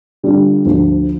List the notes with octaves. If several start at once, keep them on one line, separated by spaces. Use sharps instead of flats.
D3 G3 D4 F4
D2 D3 F3